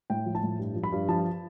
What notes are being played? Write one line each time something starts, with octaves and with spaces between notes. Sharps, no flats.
A2 G5
F3
A5
A2
G2
F3
B5
G2
F3 A5